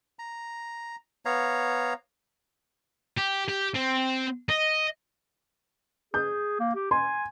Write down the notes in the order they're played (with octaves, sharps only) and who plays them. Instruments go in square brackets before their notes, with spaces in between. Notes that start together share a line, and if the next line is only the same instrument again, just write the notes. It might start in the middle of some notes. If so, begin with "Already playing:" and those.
[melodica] A#5
B3 C#5 F5 A#5
[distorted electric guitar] G4
G4
C4
D#5
[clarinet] G#4 [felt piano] G6
[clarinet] A#3
G4
[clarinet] G#5 [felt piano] C6